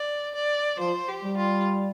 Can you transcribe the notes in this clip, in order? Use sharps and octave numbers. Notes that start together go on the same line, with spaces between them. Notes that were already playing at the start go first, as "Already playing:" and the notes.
Already playing: D5
D5
F3 C5
G4
G3
F4